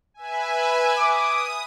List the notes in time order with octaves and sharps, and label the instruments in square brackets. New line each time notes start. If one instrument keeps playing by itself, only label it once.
[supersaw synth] B4 E5 G#5
[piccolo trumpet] D6 [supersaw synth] D#6